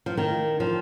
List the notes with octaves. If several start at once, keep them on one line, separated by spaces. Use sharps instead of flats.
F3
D#3
F3